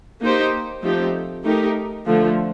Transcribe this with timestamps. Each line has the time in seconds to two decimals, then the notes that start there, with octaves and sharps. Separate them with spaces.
0.21 A#3 D#4 G4 C5
0.83 F3 A3 C4 D#4 G4
1.44 A3 D#4 G4 A#4
2.06 D3 F3 A3